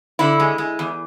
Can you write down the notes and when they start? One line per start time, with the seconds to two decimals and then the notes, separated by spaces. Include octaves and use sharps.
0.19 D3 E4
0.40 G#3
0.58 G#3
0.79 E2